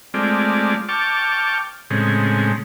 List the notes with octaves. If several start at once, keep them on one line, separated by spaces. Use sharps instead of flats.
G#3 A3 C4 F4 D5
G5 A5 C#6 D6 F6
A2 C#3 G#3 C4